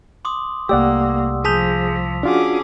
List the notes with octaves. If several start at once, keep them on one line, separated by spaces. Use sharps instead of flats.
C6 D6 D#6
C2 A3 A#3 G4 D5 F#5 E6
F3 G#4 A5 D#6 G6 B6 F7
C#4 D4 F4 F#4 G#4 D6